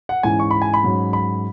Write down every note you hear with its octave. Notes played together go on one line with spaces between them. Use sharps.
F#5
G#2 E3 C#4 G#5
C#6
B5
G#5
B5
G#2 F#3 C#4
B5